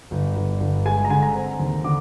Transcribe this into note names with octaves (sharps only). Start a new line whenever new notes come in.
G1
G1
G1
G#3 G#5
A#5
D3 G#5
A#5
C4
D#2
D3 D6